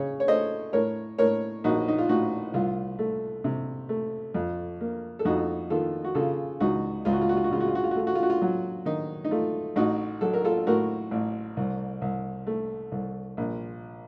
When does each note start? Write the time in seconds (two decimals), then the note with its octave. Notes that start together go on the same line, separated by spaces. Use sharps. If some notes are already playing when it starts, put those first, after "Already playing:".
Already playing: C#3 C#5
0.20 C#5
0.28 A3 C5 D#5
0.73 A2 A#4 C#5
1.18 A2 A#4 C#5
1.64 A#1 D#4 F#4
1.88 D#4
1.98 F4
2.09 A2 D#4 F#4
2.54 C2 F4
2.99 A3
3.44 C3
3.89 A3
4.34 F2
4.80 A#3
5.19 A4
5.25 F2 D#4 F#4
5.70 D#3 F4 A4
6.04 F#4
6.15 C#3 F4 A4
6.60 C#2 D#4 F#4
7.05 C#2 F4
7.13 F#4
7.21 F4
7.29 F#4
7.37 F4
7.44 F#4
7.51 C#3 F4
7.60 F#4
7.68 F4
7.75 F#4
7.84 F4
7.91 F#4
7.96 A3 F4
8.07 F#4
8.15 F4
8.23 F#4
8.30 F4
8.42 F#3
8.86 D#3 D#4
9.25 D#4
9.31 A3 F4
9.76 A1 D#4 F#4
10.21 F#3 A4
10.33 A#4
10.44 F4 A4
10.67 A2 F#4 A#4
11.11 A1
11.57 C2
12.02 C2
12.47 A3
12.92 C2
13.37 A#1